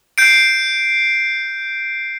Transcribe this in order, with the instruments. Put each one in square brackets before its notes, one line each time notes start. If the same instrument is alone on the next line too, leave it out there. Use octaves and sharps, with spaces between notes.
[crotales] G6 C7 D7